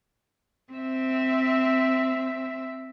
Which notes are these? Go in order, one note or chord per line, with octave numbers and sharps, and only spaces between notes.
C4 E5